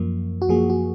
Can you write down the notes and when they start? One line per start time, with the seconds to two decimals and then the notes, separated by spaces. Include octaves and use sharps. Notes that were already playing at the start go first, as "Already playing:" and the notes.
Already playing: F#2 F3 A#3
0.42 F#4
0.49 F#2 F3 A#3 G#4
0.70 F#4